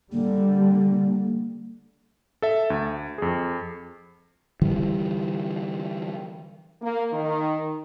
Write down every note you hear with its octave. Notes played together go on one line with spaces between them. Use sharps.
D3 G3 A#3
A4 E5
D2
F2 G#4
D3 E3 G3
A#3
D#3